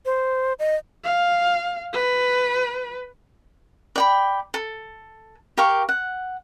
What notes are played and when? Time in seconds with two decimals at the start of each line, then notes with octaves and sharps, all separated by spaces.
0.05 C5
0.59 D#5
1.04 F5
1.93 B4
3.96 D5 G5 B5
4.54 A4
5.57 G4 A#4 F5 C#6
5.89 F#5